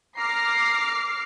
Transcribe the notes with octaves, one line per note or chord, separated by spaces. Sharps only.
A#5 D6 F6 C7